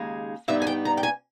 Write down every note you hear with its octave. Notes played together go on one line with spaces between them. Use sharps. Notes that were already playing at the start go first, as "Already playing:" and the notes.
Already playing: D#2 C#3 G#3 D#4
G2 G3 B3 D#4 E5
G#5
G5
A#5
G5
G#5